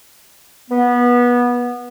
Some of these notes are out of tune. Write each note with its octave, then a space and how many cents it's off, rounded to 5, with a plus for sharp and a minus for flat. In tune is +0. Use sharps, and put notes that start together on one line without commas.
B3 -20